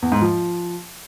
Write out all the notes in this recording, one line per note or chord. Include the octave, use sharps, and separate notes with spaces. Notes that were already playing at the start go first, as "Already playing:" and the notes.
E2
G#2
F3